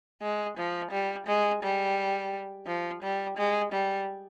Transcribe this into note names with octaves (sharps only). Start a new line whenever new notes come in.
G#3
F3
G3
G#3
G3
F3
G3
G#3
G3